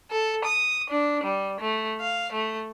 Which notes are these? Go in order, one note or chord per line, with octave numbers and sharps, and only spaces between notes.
A4
D#6
D4
G3
A3
F5
A3